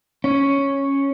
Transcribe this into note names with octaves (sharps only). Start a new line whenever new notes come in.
C#4